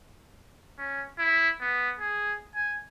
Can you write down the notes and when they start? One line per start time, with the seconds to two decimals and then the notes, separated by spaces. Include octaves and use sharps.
0.78 C#4
1.19 E4
1.61 B3
1.99 G#4
2.55 G#5